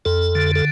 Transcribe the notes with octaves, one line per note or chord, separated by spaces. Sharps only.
F2 A4
D3
A4